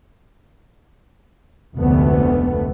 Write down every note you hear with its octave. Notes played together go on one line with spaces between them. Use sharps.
F1 D2 G#2 C3 A3 B3